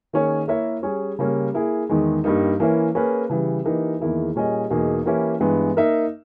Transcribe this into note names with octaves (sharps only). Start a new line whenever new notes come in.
D#3 A#3 C#4 G#4 C#5
A#3 E4 A#4 C#5 E5
G3 C#4 G#4
C#3 G3 A#3 C#4
A#3 E4 G#4
E2 D#3 G#3 D#4
G2 G3 A#3 D#4
E3 A#3 C#4 E4
A#3 C#4 G#4 B4
C#3 E3 G3
E3 A#3 D#4 G4 A#4
E2 D#3 A#3 E4 G#4
A#2 G3 C#4 G#4 D#5
E2 B2 A#3 D#4 G#4
E3 A#3 C#4 E4 G4
G2 E3 G#3 B3
A#3 D#4 A#4 E5